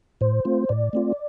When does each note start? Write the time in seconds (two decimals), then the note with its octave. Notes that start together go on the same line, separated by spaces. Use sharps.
0.21 A2 C5
0.45 A3 C4 F4
0.69 A2 D5
0.93 A3 C4 F4